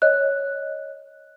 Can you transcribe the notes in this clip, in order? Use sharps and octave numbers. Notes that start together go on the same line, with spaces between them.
C#5 D#5 F#6